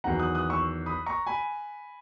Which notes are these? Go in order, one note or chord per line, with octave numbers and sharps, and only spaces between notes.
E2 D#3 F#3 F#5 A#5
D#6 F#6
D#6 F#6
C#6 E6
B5 D#6
A#5 C#6
G#5 B5